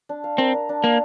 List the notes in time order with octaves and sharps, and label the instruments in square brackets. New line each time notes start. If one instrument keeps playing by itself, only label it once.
[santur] D4
F5
[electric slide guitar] C4 [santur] A#4
[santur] D4
D4
[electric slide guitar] A#3 [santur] F5